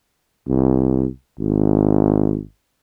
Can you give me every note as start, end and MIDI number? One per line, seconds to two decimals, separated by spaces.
0.48 1.07 36
1.39 2.41 32